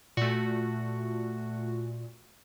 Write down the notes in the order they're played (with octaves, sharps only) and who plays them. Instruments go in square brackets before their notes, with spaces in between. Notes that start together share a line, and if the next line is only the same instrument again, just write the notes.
[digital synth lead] A#2 [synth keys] A3 F#4